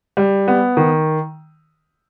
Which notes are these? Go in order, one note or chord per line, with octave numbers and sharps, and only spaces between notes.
G3
B3
D#3